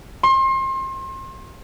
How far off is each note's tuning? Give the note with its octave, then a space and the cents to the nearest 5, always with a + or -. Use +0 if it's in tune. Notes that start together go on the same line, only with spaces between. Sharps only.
C6 +35